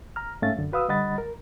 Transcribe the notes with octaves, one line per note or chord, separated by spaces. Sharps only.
A#5 F6
G#2 A3 C#4 E5 F5 A6
F#2 D3
F#4 B4 F5 D#6 E6
D3 G3 D#5 F#5 B5 A6
A#4